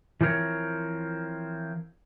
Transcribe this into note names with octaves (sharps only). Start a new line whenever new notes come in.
E3 F3 C4 A#4 C#5